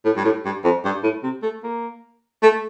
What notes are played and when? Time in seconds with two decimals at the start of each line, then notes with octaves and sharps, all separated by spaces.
0.05 A2
0.17 G2
0.25 A2
0.45 G2
0.64 F2
0.85 G2
1.03 A2
1.23 C3
1.43 A3
1.63 A#3
2.42 A3